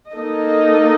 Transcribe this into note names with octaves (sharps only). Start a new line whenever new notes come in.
A#3 D#4 A4 D#5